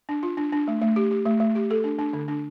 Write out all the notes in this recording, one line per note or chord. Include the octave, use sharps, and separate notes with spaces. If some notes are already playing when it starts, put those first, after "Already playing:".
D4
F4
D4
D4
A3
A3
G4
G4
A3
A3
G4
A4
D4
D4
D3
D4